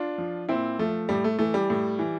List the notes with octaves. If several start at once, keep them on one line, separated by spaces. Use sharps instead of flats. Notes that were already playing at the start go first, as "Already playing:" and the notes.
Already playing: D4 F4
F3
A#2 C4 E4
F3 A3
A2 G3
A3
E3 A3
G3
A2
E3